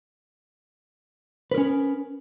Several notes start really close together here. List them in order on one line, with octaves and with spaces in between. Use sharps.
B4 A#4 C#4